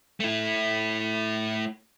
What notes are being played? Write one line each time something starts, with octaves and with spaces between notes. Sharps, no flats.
A3 E4